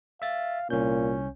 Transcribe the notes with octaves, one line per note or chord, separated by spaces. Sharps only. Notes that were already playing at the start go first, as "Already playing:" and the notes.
E5 F5 A6
C2 A#2 C#4 G6